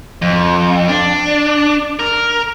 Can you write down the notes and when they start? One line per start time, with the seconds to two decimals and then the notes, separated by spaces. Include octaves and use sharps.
0.22 F2
0.88 D4
1.99 A#4